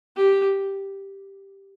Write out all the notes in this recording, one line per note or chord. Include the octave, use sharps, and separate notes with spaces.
G4